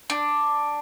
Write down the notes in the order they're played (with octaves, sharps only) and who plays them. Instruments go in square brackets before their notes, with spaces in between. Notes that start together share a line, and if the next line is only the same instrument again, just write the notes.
[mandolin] D4